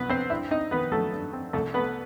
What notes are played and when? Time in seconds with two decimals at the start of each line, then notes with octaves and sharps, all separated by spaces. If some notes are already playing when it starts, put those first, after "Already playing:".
Already playing: C2 F#3 B3 B4
0.09 C4 C5
0.30 G2 E4 E5
0.51 C4 D#4 D#5
0.71 D#3 B3 B4
0.92 F#3 A3 A4
1.12 G2
1.33 C4
1.53 C2 A3 A4
1.74 A3 B3 B4